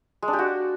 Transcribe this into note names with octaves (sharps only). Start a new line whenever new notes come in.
G#3
D4
G4
F#4